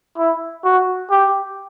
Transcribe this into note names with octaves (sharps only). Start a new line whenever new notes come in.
E4
F#4
G4